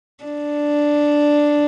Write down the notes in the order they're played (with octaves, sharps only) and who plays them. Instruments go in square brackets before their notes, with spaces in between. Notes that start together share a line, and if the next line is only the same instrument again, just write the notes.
[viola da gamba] D4